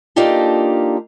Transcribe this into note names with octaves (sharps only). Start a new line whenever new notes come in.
A#3 D4 D#4 F4 G4 A4